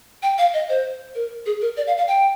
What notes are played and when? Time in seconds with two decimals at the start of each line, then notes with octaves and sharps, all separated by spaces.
0.23 G5
0.38 F5
0.54 D#5
0.69 C5
1.15 A#4
1.46 G#4
1.62 A#4
1.77 D5
1.87 F5
1.97 F5
2.08 G5